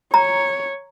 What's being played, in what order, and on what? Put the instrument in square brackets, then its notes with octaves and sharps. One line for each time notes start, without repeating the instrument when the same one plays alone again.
[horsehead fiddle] C#5 [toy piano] A#5